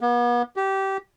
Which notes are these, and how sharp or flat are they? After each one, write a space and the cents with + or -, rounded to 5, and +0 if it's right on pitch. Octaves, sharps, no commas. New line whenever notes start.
B3 -40
G4 -20